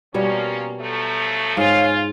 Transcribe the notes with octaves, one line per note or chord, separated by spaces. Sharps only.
B2 F3 G3 A#3 C#4 C#5
F3 F#3 A3
G#2 F4 C#5 F5 G#5